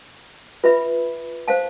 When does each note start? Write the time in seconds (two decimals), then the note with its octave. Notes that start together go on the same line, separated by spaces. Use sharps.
0.64 F4 B4 E5 B5
1.48 C5 F5 A5